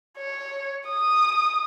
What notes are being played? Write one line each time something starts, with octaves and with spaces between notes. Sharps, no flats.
C#5
D#6